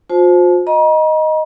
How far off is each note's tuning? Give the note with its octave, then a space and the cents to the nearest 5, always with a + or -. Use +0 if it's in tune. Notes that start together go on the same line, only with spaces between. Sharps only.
F4 +40 C5 +0 A5 -30
D#5 +0 A#5 +45